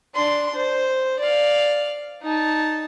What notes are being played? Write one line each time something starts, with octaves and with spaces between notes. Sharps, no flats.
D4 C6
C5
D5 F5
D#4 A5